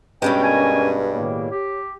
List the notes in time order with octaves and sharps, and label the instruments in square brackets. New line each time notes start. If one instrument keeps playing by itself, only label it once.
[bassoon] G2 [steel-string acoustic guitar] B2 G3 G#3 [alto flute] C#4 [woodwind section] G5
[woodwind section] A#4 D#5 G#5
[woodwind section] A2 D#3 A#3 [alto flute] C#5
[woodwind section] G4